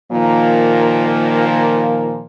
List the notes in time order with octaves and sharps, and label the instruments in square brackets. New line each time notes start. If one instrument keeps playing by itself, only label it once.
[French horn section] A#2 D#3 F3 A#3